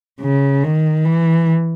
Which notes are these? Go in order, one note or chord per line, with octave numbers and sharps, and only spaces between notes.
C#3
D#3
E3